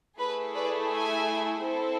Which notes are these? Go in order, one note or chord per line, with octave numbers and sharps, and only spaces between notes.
A3 E4 G#4 B4
B4 D5
E5 G#5
C4 E4 A4